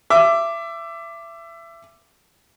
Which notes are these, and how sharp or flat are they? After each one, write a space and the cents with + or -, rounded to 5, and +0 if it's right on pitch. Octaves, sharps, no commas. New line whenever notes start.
E5 +25 D6 +0